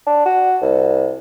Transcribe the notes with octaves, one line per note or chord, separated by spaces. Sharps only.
D4
F#4
C2